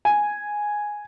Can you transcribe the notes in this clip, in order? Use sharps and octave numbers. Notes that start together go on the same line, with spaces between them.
G#5